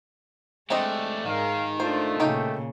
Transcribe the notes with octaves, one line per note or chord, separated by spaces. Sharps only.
G#3 A3 C4 D4 G4 D#5
G#2 D#3 G#4 A#4 F5
A3 D4 F4 C5
A#2 C#3 A#3 D#4 G4